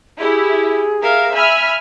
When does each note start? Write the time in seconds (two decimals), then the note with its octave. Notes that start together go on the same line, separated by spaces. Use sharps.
0.20 E4 G4 G#4
1.02 A#4 E5 F5
1.35 E5 G#5 B5 F6